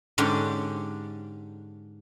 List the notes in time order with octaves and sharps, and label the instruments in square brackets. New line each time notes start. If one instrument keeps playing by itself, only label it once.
[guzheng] G#2 D3 C#4 D4 G4